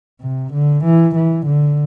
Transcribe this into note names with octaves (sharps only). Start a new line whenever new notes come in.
C3
D3
E3
E3
D3